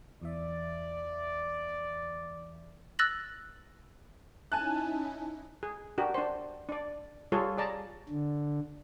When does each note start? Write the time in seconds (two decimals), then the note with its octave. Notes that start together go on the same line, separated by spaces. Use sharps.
0.21 E2 E3 D5 E5
2.99 E6 F#6 A6 A#6 F#7
4.52 C#4 D#4 E4 G#5 A5 F#6
5.63 G#4
5.98 D4 F#4 G4 A#4
6.14 D4 C5
6.69 D4 D5
7.32 G3 F4 G#4 A4 C#5
7.57 G#4 D5 A5 A#5
8.09 D3